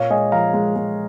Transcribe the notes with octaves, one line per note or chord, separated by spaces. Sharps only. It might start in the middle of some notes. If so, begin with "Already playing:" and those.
Already playing: A#2 C#5 F5
G#3 D#5 G#5
F3 F5 A#5
G#3
G#3